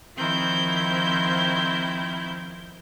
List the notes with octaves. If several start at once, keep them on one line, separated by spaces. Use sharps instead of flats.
D#3 F3 C4 E4 G6